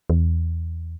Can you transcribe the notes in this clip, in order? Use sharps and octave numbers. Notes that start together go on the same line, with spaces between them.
E2